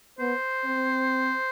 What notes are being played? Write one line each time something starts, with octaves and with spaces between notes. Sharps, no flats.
B3 C5
C4